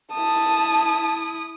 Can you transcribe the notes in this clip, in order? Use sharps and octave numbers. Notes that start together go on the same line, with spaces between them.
E4 A5 D#6